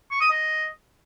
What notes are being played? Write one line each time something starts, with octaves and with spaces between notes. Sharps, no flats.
C#6
D#6
D#5